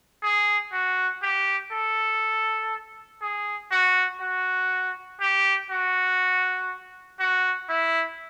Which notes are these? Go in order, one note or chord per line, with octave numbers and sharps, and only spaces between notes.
G#4
F#4
G4
A4
G#4
F#4
F#4
G4
F#4
F#4
E4